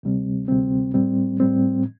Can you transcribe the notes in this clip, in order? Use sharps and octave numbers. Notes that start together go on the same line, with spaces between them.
D2 C3 G3 C4
D2 C3 G3 C4
A2 G3 C4
A2 G3 C4